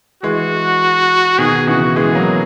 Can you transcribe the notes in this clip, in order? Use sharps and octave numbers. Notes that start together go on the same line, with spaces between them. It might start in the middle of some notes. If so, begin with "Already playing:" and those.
E3 G#3 F#4
B2 D#3 G#4
C#3 E3 F#4
E3 G#3 G#4
B3
F#3 A#3